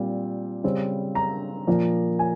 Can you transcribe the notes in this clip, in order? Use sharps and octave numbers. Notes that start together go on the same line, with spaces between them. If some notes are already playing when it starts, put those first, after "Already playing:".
Already playing: A#2 G3 C4
C#3 G3 C4
A#5
A#2 F3 A#3
G#5